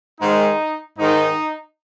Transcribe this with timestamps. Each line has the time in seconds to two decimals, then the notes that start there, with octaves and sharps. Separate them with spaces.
0.20 G#2 D#3 D#4
0.99 G#2 D#3 D#4